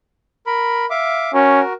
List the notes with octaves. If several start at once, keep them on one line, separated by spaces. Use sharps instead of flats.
A#4 B5
E5 F5 D6
C#4 F#4 A#4